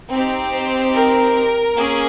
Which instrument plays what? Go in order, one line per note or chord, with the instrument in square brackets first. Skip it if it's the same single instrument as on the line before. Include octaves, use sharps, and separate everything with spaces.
[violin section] C4 D#4 G4
C5
A#4
A#3 C#4 G#4